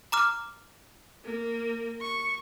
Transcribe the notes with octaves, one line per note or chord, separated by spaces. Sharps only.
A#5 D6 F6
A#3
C#6